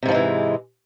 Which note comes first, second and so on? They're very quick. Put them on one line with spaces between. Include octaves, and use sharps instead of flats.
C3 G#2 F3 G#3 E3